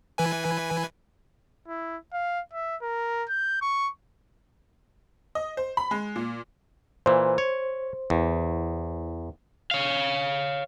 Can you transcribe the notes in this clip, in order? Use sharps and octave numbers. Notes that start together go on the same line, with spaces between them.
E3 B4 G#5
E4
F5
E5
A#4
G6
C#6
D#5
C5
B5
G#3
A#2
A#2 E3 C5
C#5
E2
C#5 F5